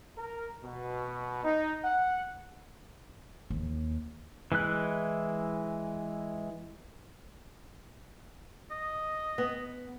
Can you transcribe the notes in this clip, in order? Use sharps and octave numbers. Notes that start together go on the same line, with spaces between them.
A#4
B2
D#4
F#5
D#2
E3 G#3 E4 F#6
D#5
B3